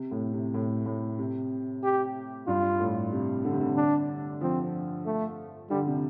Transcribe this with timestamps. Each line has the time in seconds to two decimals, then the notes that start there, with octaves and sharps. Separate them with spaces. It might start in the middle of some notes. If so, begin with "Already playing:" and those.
Already playing: C3
0.11 A2
0.33 C3
0.54 A2
0.86 A2
1.19 C3
1.84 G4
2.47 G2 F4
2.80 A2
3.12 C3
3.44 D3
3.53 C3
3.60 D3
3.77 D4
4.41 F3 C4
5.06 A3
5.70 D3 G3
5.87 C3